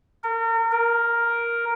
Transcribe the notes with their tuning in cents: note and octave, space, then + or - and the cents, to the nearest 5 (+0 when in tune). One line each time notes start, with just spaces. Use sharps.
A#4 -35
A#4 +5